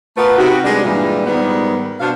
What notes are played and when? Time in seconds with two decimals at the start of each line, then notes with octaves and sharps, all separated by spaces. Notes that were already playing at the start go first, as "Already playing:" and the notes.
0.17 A3 B3 F4 A#4 B4
0.38 C3 D#4 F#4
0.64 G3 G#3 B3 D4
0.84 G2 A#2 E3 G3 G#3 F4
1.26 G#2 D#3 G3 B3
2.00 B2 D4 C5 F5